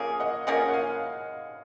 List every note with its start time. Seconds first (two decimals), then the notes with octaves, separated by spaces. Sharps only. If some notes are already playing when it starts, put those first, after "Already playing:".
Already playing: F3 A#3 C#4 G#4 C#5 F5
0.20 D#5 F#5
0.47 F3 A#3 C#4 G#4 D#5 F#5
0.68 F#5
0.73 F5 G#5